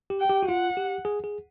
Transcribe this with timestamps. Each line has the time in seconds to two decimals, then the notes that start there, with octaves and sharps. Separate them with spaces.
0.10 G4
0.20 G5
0.30 G4
0.43 F#4
0.48 F4 F#5
0.77 G4
1.05 G#4
1.24 G#4